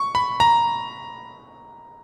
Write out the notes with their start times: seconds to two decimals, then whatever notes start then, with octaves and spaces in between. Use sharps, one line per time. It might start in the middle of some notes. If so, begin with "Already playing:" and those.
Already playing: C#6
0.15 B5
0.40 A#5